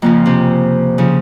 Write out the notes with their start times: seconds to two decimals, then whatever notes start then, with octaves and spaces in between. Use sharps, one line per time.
0.02 F2 C#3 F3 A#3
0.26 C3 C4
0.98 C#3 F3